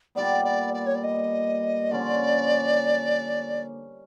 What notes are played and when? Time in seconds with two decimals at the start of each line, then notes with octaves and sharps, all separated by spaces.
0.15 A#2 G3 B3 D5
0.44 D5
0.73 D5
0.86 C#5
0.95 D5
1.03 D#5
1.91 D3 F3 A#3 C#4 D5